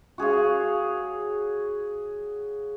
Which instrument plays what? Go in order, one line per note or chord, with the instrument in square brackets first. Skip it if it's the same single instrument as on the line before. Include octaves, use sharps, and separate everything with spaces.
[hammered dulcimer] F#4 G#4 C#5 F5